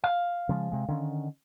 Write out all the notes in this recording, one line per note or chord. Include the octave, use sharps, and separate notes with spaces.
F5
C#3 F3 G#3
C3 G#3
D3 D#3 C#4